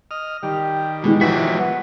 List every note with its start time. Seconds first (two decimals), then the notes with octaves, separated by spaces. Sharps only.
0.11 D#5 F6
0.43 D#3 G3 G4
1.04 B2 E3 G#3
1.21 E3 F3 F#4 B6
1.59 B3